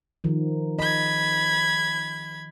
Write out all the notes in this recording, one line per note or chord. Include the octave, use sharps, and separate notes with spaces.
D#3 F3
D#5 B5 G#6